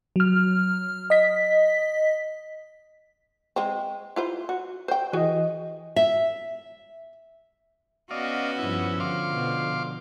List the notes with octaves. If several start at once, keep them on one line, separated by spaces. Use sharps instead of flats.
F#3 F6
D#5 B6
G#3 C4
E4 F4 C5
F#4
C5 G5
E3 F#4 G#4 D#5 G#5
E5
B3 C#4 F#4 D5 D#5 F5
G2 F3 E4
D3 F3 F5 C6 D6
B2